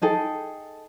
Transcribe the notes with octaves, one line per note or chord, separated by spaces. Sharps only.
D#4 G#4 A4 G5